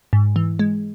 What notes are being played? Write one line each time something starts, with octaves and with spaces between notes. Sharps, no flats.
G#2
E3
G#3